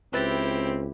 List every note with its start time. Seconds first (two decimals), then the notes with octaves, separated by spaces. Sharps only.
0.13 C#2 C4 E4 G4 B4 E5 A6